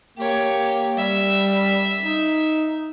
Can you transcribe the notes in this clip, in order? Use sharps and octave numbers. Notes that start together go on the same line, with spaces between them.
A#3 G4 C#5
G3 E5
D#4